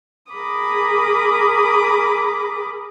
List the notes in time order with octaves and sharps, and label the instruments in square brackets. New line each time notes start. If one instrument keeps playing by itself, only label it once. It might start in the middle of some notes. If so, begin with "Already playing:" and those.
[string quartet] G#4 A#4 B5 D6 D#6